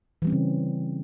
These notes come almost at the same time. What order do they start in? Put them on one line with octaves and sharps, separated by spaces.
E3 G3 C4 C#4 C#3